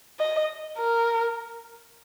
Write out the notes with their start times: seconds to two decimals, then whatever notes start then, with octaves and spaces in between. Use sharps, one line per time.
0.19 D#5
0.78 A#4